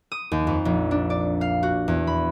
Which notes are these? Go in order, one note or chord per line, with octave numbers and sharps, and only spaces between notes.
D#6
D#2
F2
A#1
D4
D5
F5
F#4
E2
B5